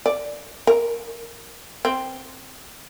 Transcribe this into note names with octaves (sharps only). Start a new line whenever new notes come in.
D5
A#4
C4